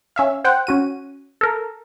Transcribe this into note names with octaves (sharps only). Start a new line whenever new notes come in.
C#4 E5 F5
C5 F#5 G5
C#4 F#4 D#7
A4 A#4